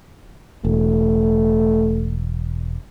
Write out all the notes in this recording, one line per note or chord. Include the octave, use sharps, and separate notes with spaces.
E1 A3